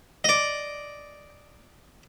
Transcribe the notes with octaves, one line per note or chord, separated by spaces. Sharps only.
D5 D#5